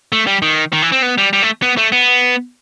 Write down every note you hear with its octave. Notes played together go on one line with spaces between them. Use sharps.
A3
G3
D#3
D#3
E3
C4
B3
G3
G3
A3
B3
A3
B3